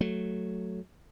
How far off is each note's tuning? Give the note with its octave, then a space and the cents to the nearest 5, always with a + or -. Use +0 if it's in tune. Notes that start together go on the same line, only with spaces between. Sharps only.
F#3 +0 A3 +0